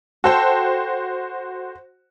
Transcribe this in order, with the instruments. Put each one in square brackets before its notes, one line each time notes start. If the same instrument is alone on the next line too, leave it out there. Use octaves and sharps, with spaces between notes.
[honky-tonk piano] F#4 C5 [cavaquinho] A4 G5